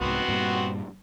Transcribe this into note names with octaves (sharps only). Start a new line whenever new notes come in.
C2 G#2 B3 C4 F#4
G2 A#2 G3